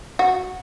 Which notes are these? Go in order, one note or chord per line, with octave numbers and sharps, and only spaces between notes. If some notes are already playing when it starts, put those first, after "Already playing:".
F#4